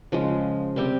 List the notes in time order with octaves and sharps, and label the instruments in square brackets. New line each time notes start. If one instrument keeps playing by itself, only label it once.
[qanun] C#3 F3 G#3
C3 G3 C4 G4